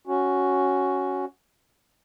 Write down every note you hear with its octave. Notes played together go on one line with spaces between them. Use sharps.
C#4 F#4